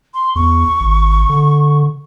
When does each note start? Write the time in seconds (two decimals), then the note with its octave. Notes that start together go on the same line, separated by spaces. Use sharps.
0.14 C6
0.35 E2 C#6
0.80 G#1
1.29 D3